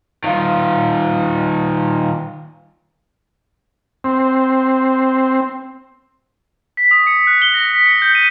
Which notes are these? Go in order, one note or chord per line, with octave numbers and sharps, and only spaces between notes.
D#3 F4
C4
B6
D#6
C#7
F#6
G7
A#6
B6
C#7
G6
D#7